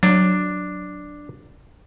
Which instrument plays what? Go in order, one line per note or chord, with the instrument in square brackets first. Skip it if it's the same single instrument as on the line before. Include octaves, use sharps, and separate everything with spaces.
[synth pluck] F#3 [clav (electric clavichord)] D4